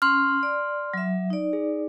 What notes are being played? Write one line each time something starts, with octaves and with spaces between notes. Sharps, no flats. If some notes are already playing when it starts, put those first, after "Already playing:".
C#4 C6 F6
D5
F#3 E5
D#4 D5
G#4